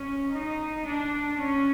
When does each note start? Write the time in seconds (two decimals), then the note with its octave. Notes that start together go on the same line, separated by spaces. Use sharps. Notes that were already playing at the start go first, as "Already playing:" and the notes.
Already playing: C#4
0.31 D#4
0.84 D4
1.37 C#4